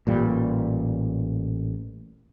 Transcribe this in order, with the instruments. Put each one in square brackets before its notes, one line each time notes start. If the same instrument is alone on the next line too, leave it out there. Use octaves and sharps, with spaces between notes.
[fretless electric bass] A1 A#2 G3